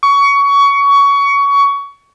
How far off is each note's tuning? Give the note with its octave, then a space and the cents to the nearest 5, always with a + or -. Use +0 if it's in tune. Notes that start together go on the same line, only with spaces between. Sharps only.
C#6 +20